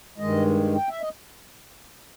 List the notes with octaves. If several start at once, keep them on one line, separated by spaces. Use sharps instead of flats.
G2 D#3 G#3 D#5
G5
E5
D#5